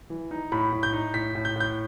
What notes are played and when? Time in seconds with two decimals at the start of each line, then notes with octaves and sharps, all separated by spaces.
0.10 E3
0.31 D#4
0.52 A2 B5
0.73 A2
0.83 G6
0.93 D#4
1.14 A2 B6
1.35 A2
1.45 G6
1.56 A2 G6